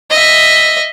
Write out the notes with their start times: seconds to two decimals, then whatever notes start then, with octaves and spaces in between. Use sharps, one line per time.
0.11 D#5 E5